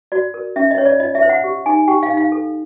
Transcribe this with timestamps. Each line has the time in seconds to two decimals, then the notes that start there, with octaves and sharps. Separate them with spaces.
0.12 F#4 D5
0.34 A#4
0.56 C#4 E5
0.71 D#5
0.78 C#4 C#5
0.85 D5
1.00 F4 D#5
1.15 E5
1.22 C5
1.29 F#5
1.44 G4
1.66 D#4 G#5
1.88 G4 G5
2.03 F5
2.10 D#4
2.17 F5
2.32 A4